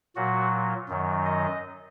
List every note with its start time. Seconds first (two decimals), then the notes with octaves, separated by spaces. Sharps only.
0.16 A#2 F#3 F#4
0.89 F#2 D#3 F#3
1.25 D#5